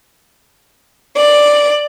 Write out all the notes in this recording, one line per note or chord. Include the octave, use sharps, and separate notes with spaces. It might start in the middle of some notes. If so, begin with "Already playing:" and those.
D5